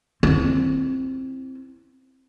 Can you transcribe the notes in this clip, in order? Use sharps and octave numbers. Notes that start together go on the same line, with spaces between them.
C4 E4